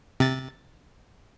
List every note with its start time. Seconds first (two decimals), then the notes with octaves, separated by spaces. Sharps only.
0.20 C3 A6